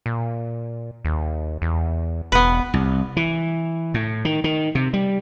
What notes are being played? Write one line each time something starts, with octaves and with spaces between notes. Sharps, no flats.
A#2
D#2
E2
E1 B3 B4
C2
E3
A2
D#3
D#3
C3
G3